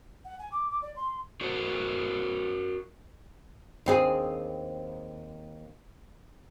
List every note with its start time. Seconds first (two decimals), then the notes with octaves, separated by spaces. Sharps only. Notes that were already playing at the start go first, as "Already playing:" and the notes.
0.24 F#5
0.38 G#5
0.51 D6
0.70 D6
0.82 D5
0.96 C6
1.41 F#4 A#4 C5 D5
3.86 D#2 C4 G#4